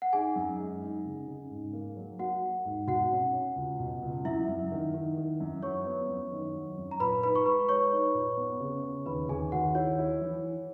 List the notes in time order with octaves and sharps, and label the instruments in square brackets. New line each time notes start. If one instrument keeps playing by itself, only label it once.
[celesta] F#5
[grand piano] D#4 [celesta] G#4 G#5
[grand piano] F#2
G#3
D#4
C#3
C#3
G#2
A#3
F#3
[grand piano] A#3 [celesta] F#4 F#5
[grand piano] A#3
G#2
[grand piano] B2 [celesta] F#4 F#5
[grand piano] C#4
C#4
C#2
B2
C#2
[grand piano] F#2 [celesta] E4 E5
[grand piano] F#2
D#3
D#3
D#3
F#2
[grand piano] F#3 [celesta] C#5 C#6
[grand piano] B3
F#2
D#3
F#3
F#2
[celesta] A#5
[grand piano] A#2 [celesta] B4 B5
[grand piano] D#4 [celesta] B4 B5
[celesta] C#6
[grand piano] G#3 [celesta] B4 B5
[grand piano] G#3 [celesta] C#5 C#6
[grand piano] D#4
A#2
B3
C#3
C#3
[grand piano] D#2 [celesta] B4 B5
[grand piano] D#2 [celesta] G#4 G#5
[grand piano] D#2 [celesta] F#4 F#5
[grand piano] E4 [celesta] C#5
[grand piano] E4
E3